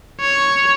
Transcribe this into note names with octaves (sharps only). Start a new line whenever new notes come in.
C#5